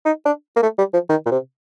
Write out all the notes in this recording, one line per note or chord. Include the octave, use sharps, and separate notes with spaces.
D#4
D4
A#3
A3
G3
F3
D#3
A#2
C3